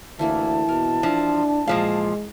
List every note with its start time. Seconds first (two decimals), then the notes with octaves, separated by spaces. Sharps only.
0.19 D2 E3 A#3 E4 A5
0.69 B2 A#4
1.03 F3 D4 E4
1.68 A#2 F3 G#3 F5